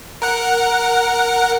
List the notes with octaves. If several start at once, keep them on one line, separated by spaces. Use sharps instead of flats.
A#4 F#5